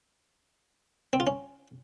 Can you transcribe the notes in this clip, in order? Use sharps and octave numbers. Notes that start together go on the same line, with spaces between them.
C4
F4
C#4